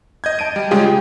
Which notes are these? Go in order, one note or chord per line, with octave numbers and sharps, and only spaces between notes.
D#5 G6 G#6
A5 D7 D#7
G3
C#3 G#3 F4 G4 G#4
G5